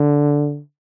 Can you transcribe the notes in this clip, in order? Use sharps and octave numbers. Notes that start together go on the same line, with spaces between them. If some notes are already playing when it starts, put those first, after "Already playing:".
Already playing: D3